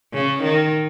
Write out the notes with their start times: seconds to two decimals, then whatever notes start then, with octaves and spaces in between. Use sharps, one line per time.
0.13 C#3
0.43 D#3